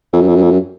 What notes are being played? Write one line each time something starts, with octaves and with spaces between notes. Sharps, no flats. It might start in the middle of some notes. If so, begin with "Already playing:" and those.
F2
F#2
F2
F#2
F2
F#2